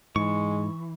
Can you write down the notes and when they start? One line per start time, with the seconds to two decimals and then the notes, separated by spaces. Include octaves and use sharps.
0.16 G#2 E3 G#3 C#6